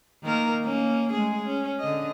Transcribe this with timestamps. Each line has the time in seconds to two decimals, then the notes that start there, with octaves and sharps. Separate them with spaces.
0.23 D#3 A#3 A#4
0.64 A#3 C#4
1.12 G#3 A3 G#4
1.44 C#4
1.80 D3 D#5